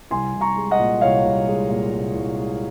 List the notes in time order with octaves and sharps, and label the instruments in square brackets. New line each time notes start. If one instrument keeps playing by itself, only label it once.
[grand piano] C2 G#5 C6
C2
A#5 C#6
G#3
D#5 F#5
A#2
C2 C#5 F5
C2
G#3
A#2
C2
C2
G#3